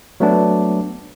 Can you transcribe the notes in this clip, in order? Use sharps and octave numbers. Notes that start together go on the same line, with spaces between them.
F#3 A3 B3 D4